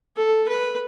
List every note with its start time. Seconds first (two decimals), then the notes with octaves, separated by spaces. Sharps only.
0.17 A4
0.48 B4